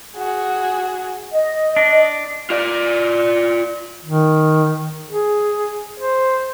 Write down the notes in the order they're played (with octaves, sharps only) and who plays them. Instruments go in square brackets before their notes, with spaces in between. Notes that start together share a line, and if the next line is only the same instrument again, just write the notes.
[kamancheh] F#4 G#4
[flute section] D#5
[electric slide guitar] D4
[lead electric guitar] F4 D5
[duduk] D#3
G#4
C5